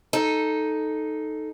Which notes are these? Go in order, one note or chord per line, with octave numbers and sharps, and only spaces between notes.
D#4 A4